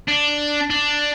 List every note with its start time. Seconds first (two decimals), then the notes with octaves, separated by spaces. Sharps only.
0.09 D4
0.70 D4